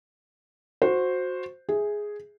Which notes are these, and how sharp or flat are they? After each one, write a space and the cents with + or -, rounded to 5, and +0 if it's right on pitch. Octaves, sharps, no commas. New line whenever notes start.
F#4 -15 C5 +0
G#4 +0 E5 -15